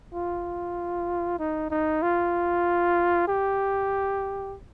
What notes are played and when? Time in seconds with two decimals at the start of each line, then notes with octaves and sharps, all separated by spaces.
0.14 F4
1.39 D#4
1.71 D#4
2.02 F4
3.28 G4